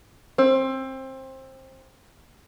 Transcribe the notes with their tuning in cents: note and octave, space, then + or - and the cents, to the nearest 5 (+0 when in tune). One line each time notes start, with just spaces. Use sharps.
C4 +20